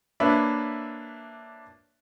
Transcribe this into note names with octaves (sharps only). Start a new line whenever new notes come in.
A#3 D4 B4 C#5 E5